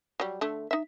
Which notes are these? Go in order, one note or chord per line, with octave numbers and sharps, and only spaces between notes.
F#3 G3
D3 A3
D#4 E5